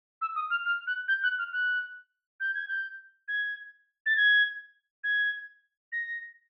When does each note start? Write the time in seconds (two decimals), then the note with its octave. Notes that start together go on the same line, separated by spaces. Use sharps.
0.21 E6
0.36 D#6
0.50 F6
0.65 F6
0.87 F#6
1.08 G6
1.23 F#6
1.39 F6
1.53 F#6
2.40 G6
2.54 G#6
2.68 G6
3.28 G#6
4.06 A6
4.17 G#6
5.04 G#6
5.92 A#6